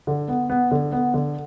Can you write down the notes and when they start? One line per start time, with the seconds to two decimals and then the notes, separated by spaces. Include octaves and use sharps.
0.07 D3
0.28 B3
0.50 B3
0.71 D3
0.92 B3
1.14 D3